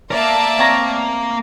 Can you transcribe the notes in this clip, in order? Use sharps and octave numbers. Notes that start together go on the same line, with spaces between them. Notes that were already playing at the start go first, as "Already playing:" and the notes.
A#3 A#4 D5 E5 A5
C4 C#5 A#5